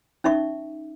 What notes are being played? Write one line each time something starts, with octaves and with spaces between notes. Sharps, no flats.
C#4 D#4 E5 C#6